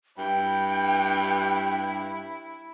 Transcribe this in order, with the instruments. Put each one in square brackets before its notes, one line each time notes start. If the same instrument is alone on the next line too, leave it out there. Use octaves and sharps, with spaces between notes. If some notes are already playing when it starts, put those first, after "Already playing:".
[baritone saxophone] G2 [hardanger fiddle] E4 [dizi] G5